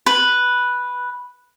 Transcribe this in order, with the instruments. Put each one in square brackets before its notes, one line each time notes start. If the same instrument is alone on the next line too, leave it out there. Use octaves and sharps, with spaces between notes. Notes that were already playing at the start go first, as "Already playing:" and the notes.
[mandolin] B4